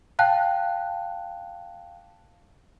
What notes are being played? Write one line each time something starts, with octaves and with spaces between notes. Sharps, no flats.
F5 G5 A5 F#6